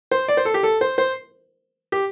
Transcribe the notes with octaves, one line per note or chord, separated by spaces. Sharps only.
C5
D5
C5
A4
G4
A4
C5
C5
G4